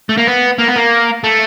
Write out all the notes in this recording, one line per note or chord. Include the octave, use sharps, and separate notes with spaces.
A3
A#3
B3
A#3
B3
A#3
A3